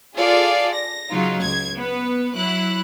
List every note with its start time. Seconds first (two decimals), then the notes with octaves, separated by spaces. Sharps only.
0.16 F4 G#4 A4 D5 F5
0.73 A#6
1.10 C#3 F#3 D#4 F4
1.42 C#2 G#6
1.74 B3 B4
2.34 F#3 E4 F#6